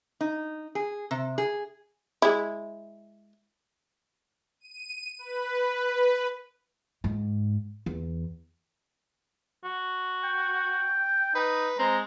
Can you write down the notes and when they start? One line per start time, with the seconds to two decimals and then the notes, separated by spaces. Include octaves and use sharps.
0.21 D#4
0.75 G#4
1.11 C3
1.38 G#4
2.22 G#3 E4
4.60 D#7
5.19 B4
7.04 G#2
7.86 E2
9.65 F#4
10.24 G5
11.35 D#4 B4
11.79 G#3 C4 A#5